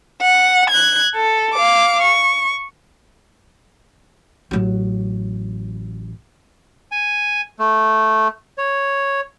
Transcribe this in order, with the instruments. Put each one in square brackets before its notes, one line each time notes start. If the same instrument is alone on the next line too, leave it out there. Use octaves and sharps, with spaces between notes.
[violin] F#5
F#6 G#6
A4
F5 D6
C#6
[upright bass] A1 F#3
[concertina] G#5
A3
C#5